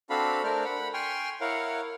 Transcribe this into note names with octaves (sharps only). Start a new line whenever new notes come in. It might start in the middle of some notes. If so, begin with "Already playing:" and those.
C4 D4 F#4 A4 F5 B5
A3 D4 A#4 C5 D5 F6
F#5 B5
G5 G#5 C6 C#6 F6
E4 A#4 C#5 F5 F#5